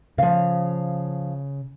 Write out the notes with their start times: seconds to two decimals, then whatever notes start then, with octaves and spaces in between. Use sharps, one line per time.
0.18 C#3 F3 F5